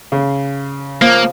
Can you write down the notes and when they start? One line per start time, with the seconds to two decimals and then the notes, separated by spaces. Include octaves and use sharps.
0.12 C#3
1.02 F3 A#3